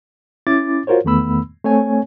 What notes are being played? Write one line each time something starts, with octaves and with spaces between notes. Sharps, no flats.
C#4 E4 D6 A6
F4 F#4 A#4 C5 C#5
E2 D#3 A3 B3 B5 E6
A3 C4 C#5 G#5